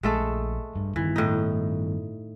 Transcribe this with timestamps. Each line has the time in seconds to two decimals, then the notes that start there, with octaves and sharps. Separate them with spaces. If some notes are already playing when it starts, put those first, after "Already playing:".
0.03 A#1 G#3 A3 A4
0.76 G2
0.96 G2 D#3 E3
1.16 A2 D#4